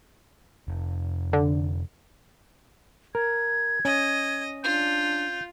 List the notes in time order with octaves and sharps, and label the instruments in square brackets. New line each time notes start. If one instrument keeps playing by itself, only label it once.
[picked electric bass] F1
[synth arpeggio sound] D3
[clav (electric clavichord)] A#4 [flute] G#6
[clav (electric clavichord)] C#4 [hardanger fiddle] D#5
[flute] D4 [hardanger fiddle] F4 [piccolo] G6